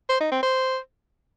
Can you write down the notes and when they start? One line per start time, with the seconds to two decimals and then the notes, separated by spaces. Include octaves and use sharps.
0.09 C5
0.21 D#4
0.32 C4
0.43 C5